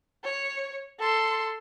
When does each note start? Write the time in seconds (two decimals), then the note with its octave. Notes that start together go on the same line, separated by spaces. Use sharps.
0.24 C#5
0.99 A4 C6